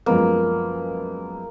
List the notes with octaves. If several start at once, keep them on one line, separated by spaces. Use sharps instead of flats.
F#2 F3 G#3 A#3 B3